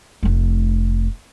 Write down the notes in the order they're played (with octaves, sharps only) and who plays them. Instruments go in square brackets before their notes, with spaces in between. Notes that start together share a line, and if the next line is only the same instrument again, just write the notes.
[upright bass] F1 A3